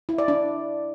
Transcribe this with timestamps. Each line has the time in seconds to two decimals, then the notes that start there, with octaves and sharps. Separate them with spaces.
0.09 E4
0.18 D5
0.28 D4